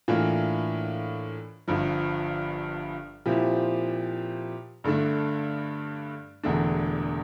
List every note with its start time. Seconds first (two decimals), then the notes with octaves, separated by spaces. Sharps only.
0.08 A2 E3 A#3 D4 F4
1.68 G1 G2 F3
3.26 A#2 F3 C4 E4 G4
4.84 G2 D3 A3 D4
6.44 E1 E2 D3 A3 D4